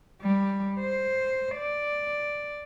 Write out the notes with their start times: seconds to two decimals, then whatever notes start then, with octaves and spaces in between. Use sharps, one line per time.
0.22 G3
0.80 C5
1.56 D5